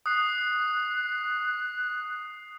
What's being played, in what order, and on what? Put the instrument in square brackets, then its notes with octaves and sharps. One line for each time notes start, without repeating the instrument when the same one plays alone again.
[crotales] D#6 C7 [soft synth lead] F#6